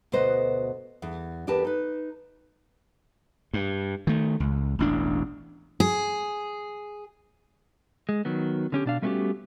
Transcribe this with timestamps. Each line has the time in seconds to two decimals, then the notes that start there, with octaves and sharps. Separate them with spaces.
0.12 D2 B2 B4 C5 D#5
1.02 E2
1.47 E2 D4 G4 A#4 B4 A5
1.65 D#4 B4
3.54 G2
4.07 D#3 A3
4.40 C#2
4.79 E1 A1 D4
5.80 G#4
8.09 G#3
8.25 D#3 F#3 B3
8.72 D3 C#4 G4
8.86 B2 D4 F5
9.02 G3 A3 B3 C#4 F#4 G4